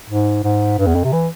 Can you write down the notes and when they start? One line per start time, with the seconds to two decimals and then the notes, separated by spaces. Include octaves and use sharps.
0.09 G#2
0.44 G#2
0.78 G2
0.86 E2
0.95 F2
1.04 C3
1.12 E3